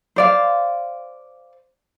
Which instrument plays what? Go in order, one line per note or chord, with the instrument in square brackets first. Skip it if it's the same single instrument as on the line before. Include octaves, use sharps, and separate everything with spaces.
[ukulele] C5 D5 F5